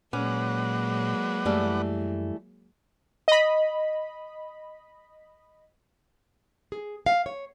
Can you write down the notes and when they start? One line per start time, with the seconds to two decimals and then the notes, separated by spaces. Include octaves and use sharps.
0.13 A#2 F#3 G#3 A#3 C#4 B4 D5 F#5
1.45 F#2 E3 G3 A3
3.28 D#5 B5
6.72 G#4
7.06 F5
7.26 C#5